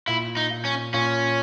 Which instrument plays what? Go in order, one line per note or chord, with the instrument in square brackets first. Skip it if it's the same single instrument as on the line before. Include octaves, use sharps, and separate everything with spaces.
[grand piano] A#2 [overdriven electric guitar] E4
[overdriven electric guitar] D#4
[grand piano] A#2
[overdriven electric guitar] C#4
[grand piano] A#2 [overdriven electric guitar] C#4